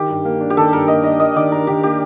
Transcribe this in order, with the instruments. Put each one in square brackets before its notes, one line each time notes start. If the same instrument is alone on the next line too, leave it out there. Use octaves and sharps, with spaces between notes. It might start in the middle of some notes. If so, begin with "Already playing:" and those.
Already playing: [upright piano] D#3 [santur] G4
[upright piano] G2
A#3
D4
[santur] G4
[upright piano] D#3 [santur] A4
[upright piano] G2 [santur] A#4
[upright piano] A#3 [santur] D#5
[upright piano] D4 [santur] D#5
[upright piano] A#3 [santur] D#5
[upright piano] D#3 [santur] D5
[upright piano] D4 [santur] A#4
[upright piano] D#3 [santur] G4
[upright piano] A#3 [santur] G4